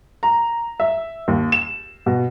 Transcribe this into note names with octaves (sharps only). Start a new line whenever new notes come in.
A#5
E5
D#2
E7
B2